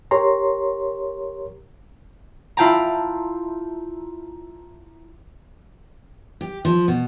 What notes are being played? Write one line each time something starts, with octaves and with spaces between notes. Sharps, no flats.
G4 A#4 C#5 A#5 C6
E4 F4 G5 A5 A#5
G4
F3
B2